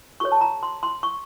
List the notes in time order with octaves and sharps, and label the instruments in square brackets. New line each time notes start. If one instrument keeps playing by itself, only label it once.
[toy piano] F#4 A4 C#5 C#6
A5
A#5
C6
C6
C#6